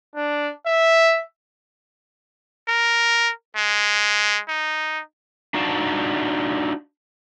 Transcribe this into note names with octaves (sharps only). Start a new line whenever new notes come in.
D4
E5
A#4
G#3
D#4
D4 D#4 F#4 D5 F5 A5